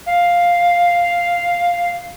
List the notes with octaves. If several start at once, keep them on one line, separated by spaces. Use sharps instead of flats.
F5